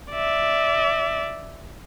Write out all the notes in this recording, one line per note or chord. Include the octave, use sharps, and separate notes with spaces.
D5 E5